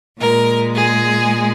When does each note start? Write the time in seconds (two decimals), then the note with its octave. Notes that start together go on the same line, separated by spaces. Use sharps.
0.20 A#2 G#3 A#4
0.74 G#4